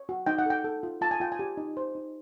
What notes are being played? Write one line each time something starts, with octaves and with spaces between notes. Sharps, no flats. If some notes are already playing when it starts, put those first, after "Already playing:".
Already playing: C#5
F#4
D#4 G5
F#5
A4 G5
A4
F4
F4 A5
G#5
F4 G5
G#5
G4
D#4
C5
D#4